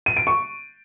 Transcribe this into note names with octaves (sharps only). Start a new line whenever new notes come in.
D#7
D7
C#6